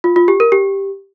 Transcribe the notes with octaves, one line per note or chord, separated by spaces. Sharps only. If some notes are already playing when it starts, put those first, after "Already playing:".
F4
F4
G4
A#4
G4